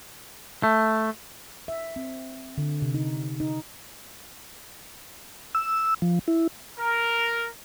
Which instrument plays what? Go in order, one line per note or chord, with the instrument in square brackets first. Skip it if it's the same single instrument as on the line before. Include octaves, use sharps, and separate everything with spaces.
[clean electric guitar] A3
[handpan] E5
C4
D3
C3
D#4
D#4
[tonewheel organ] E6
F3
E4
[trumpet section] A#4